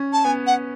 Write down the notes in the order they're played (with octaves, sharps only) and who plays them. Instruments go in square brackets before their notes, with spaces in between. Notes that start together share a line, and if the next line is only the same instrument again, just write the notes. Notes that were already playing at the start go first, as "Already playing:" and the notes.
Already playing: [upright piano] C#4
[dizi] A5
[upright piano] B3 [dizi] G#5
[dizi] F#5